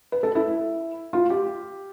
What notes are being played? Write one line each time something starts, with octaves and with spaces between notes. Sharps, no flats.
B4
A4
E4
F4
G4